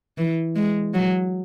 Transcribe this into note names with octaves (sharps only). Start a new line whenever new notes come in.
E3
G#3
F#3